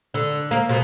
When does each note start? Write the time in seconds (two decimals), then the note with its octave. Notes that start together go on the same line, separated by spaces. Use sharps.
0.14 D3
0.51 A#3
0.69 B2